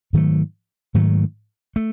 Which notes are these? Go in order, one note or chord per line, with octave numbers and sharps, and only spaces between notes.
G#2 D#3 F#3 A3
G#2 D#3 F#3 A3
A3